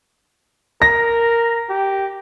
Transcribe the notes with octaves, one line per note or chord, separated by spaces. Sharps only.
A#4 A#6
G4